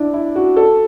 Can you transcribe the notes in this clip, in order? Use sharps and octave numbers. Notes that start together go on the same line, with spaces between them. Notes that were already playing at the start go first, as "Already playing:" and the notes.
Already playing: D4 E4
E4
F#4
A4